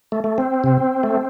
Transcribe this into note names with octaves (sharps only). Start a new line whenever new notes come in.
A3
A3
C4
C3
A3